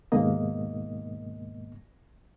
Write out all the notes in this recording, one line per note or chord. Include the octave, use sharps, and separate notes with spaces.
D#2 G#2 B2 A#3 D#5